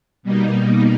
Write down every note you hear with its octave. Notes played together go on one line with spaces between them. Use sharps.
B2 G3 A#3 D#4